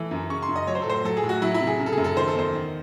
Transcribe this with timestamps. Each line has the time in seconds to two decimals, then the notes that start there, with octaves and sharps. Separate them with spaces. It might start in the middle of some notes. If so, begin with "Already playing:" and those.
Already playing: E3 A3
0.11 F#2
0.30 C#3 C#6
0.42 C6
0.49 F#2
0.56 D#5
0.67 F#3 C#5
0.75 C5
0.82 A4
0.86 A2 C5
1.05 F#3 A4
1.17 G#4
1.24 A2
1.29 F#4
1.42 F#3 E4
1.54 E4
1.61 C3
1.67 G#4
1.80 C#3
1.86 A4
1.92 G#4
1.98 F#2
2.04 A4
2.16 D#3 C5
2.28 A4
2.35 E2 C5
2.54 D#3